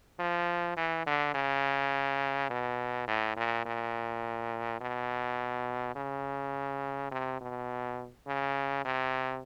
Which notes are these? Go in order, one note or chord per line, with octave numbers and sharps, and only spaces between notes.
F3
E3
D3
C#3
B2
A2
A#2
A#2
B2
C#3
C3
B2
C#3
C3